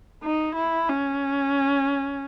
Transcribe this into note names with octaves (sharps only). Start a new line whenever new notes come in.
D#4
E4
C#4